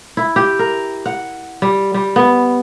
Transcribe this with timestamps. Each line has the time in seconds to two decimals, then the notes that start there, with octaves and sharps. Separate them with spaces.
0.17 E4
0.36 G4
0.59 A#4
1.06 F#5
1.62 G3
1.94 G3
2.16 B3